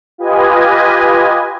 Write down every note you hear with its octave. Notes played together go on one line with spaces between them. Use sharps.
F4 G4 B4 D#5 G#5